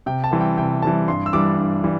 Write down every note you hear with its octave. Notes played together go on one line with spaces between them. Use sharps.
C3 G5
A5
E3 G3 C4
G5
C3 G5
E3 G3 C4 A5
G2 C6
E6
E3 G3 D4 D6
G2
E3 G3